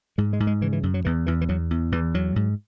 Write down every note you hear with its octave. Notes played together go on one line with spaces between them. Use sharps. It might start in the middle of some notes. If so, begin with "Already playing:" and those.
G#2 G#3
G#3
G#2
G#3
C#3 E3
E3
F#2
F#3
E2 E3
E2 E3
E3
E2 F#3
E2
E2 E3
E2 F#3
G#2